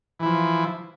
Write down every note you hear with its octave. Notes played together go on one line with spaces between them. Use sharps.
E3 F3 E4